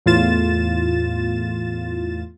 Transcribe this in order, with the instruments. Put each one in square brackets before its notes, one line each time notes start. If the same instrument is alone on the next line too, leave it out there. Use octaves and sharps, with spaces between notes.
[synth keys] E2 A2 F4 A6 E7